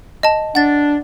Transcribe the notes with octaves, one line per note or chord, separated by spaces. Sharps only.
D#5 A5
D4 F#5 A6